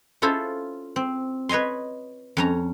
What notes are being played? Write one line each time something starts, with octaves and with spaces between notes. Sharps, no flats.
C#4 E4 F4 A4 C5
C4
B4 C#5 D#5 G#5 C6
F2 C#4 A#5